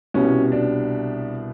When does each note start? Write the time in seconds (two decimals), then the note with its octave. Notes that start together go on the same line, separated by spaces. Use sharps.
0.14 C2 B2 G3 C#4
0.52 D4